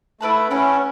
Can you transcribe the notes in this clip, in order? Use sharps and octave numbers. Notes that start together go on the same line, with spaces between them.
A3 E4 B4 F#5 A5
C#4 E4 B4 F#5 A5